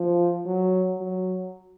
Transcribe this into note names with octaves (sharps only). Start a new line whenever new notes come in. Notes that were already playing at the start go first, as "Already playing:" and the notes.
Already playing: F3
F#3
F#3